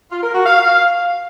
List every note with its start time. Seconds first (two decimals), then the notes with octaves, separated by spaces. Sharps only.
0.12 F4
0.23 A#4
0.35 F#4
0.46 F5